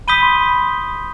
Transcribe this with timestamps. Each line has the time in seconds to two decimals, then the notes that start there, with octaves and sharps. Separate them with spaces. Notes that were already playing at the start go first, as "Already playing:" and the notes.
0.08 B5 D#6 G6 B6 D#7 G7
0.22 C6
0.37 B5